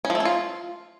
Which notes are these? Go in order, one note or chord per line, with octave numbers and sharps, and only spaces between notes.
C#4
F3
A3
C#4
F4